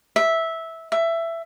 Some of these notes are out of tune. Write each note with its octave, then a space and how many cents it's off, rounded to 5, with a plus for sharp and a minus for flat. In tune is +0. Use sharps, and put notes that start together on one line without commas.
E5 -10
E5 +15